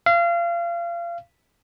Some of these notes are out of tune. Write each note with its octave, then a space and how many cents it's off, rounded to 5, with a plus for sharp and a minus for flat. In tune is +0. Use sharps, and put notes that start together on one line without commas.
F5 -30